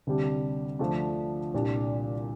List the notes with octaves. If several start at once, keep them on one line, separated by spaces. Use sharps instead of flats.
D2 C3 G3 D4
D2 D3 F3 A3 D4
C2 A#2 G3 D4